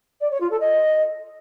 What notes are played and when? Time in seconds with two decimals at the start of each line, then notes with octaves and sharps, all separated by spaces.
0.20 D5
0.30 C#5
0.40 F4
0.50 A4
0.60 D#5